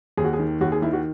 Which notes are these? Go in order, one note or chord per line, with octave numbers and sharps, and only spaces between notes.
D#2 G#4
F#4
G#4
D#3
D#2 F#4
G#4
D#3 E4
F#4